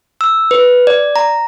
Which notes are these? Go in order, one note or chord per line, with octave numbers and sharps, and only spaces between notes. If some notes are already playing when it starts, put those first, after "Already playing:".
E6
B4
D5
A#5